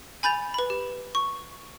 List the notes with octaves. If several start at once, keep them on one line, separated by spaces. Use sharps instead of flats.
G#5 B5 G6 A6 F7
B4 B5
G4
C#6